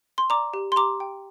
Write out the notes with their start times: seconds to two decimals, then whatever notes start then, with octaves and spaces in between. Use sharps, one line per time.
0.18 C6
0.30 D5 A#5 D6
0.54 G4
0.72 C6
0.76 G4 A#5 D6
1.00 G5